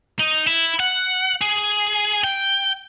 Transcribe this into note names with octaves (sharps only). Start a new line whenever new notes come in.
D#4
E4
F#5
G#4
G5